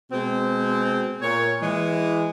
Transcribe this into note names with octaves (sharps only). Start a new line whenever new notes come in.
B2 G#3 C4
A#2 A#4 C#5
E3 G#3